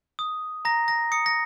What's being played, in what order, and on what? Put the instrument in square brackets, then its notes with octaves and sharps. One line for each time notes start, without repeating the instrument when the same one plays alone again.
[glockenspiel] D#6
A#5 A#6
A#6
D#6 C#7
A#6